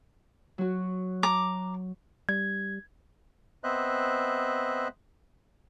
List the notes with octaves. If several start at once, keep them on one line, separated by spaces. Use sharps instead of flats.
F#3 F#4
A#5 D6
G3 G#6
B3 C4 C5 D#5 E5 F#6